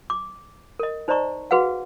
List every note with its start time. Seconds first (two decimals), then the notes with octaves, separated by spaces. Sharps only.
0.10 D6
0.79 A#4 D#5
1.08 D#4 C5 D5 D#5 A#5 C#6
1.51 F#4 G#4 B4 F5 F#5